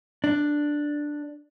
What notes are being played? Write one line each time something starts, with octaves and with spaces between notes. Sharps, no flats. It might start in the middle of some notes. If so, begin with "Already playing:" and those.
D4